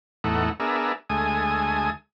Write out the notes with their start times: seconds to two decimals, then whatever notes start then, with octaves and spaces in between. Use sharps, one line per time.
0.24 E2 A2 A3 D#4 F#5
0.60 B3 D4 G#4 A#4 E5
1.10 D2 G#3 A3 G#5 D#6